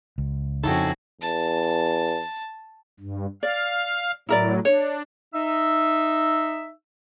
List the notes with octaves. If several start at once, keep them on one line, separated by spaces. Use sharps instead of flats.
C#2
F2 C#3 D#4 E4 F#4 G#4 A4 G5
E2 A5
G2
D5 F5
A2 F#3 E4 A#4 D5
D4 C#5
D#4 E5 E6